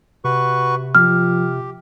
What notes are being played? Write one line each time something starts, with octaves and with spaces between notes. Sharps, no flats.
C3 F#4 B4 C#6
F3 G4 F6